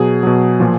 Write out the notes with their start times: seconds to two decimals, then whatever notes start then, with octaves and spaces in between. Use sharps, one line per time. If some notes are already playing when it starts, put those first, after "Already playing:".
Already playing: B2 F#3 G#4
0.23 B2 F#3
0.60 A#2 F3